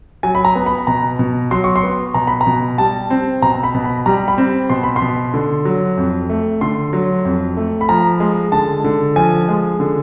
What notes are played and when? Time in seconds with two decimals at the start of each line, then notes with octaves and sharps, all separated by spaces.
0.23 F#3 G#5
0.35 B5
0.45 A#5
0.55 B3
0.66 B5
0.87 B2 A#5
1.19 B2
1.51 F#3 C6
1.64 C#6
1.76 C6
1.83 B3
2.14 B2 A#5
2.27 B5
2.41 A#5
2.47 B2
2.78 G3 A5
3.10 C4
3.42 B2 A#5
3.63 B5
3.74 B2
3.84 B5
4.06 G3 A#5
4.28 B5
4.38 C4
4.70 B2 C6
4.83 B5
4.96 C6
5.02 B2
5.34 D3
5.65 F#3
5.97 F2
6.30 A3
6.61 D3 C6
6.93 F#3
7.25 F2
7.57 A3
7.81 B5
7.89 F3 A#5
8.20 G#3
8.52 D3 A5
8.84 D3
9.16 F3 G#5
9.48 G#3
9.80 D3